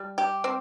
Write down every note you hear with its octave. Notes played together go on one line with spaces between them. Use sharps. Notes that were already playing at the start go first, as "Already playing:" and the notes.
Already playing: G3
G4
C4